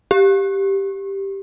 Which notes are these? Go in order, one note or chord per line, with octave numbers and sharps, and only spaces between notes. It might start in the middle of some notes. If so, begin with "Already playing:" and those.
G4